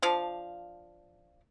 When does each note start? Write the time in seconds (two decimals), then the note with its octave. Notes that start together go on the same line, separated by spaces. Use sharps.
0.02 F3 D4 F5